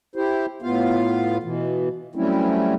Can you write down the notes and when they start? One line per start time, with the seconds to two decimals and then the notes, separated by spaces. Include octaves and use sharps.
0.16 E4 G4 C5
0.62 A2 B3 F4 F5
1.43 B2 E3
2.15 F#3 G3 A3 C4 C#4 E4